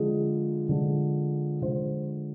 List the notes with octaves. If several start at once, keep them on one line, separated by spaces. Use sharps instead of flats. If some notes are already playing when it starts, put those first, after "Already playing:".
Already playing: D3 F3 G#3 G#4
D3 F3 G#3
D3 F3 G#3 C5